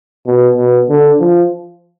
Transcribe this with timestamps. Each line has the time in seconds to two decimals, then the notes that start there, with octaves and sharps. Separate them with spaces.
0.26 B2
0.57 B2
0.89 D3
1.20 F3